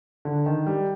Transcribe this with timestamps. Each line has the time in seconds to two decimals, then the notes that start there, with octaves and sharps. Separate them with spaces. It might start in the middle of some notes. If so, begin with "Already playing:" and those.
0.25 D3
0.46 D#3
0.66 G3